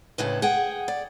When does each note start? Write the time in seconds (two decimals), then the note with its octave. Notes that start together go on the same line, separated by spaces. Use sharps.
0.18 D2 A2 C#3 B4
0.42 G#4 F#5 G5
0.88 D5